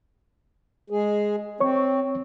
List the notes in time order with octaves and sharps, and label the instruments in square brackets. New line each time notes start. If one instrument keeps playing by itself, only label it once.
[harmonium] G#3 G#4
[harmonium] C4 [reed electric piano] C#5 C#6